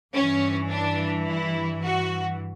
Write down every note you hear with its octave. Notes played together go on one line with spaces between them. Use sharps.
G2 E3 C#4
D4
E4
F#4